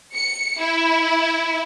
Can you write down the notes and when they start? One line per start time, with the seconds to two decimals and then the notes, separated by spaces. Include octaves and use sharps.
0.14 C#7
0.60 E4